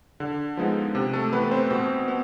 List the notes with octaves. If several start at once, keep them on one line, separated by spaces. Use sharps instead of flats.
D3
F3 G#3 B3 D#4
C3
A3 A4
E3 A3 B3 B4
C4 C5
B2 C4 C5
B3